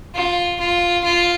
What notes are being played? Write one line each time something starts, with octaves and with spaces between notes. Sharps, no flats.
F4
F4
F4